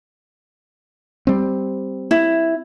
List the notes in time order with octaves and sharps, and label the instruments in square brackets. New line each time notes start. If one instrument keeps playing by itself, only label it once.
[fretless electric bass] G3 C4
[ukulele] E4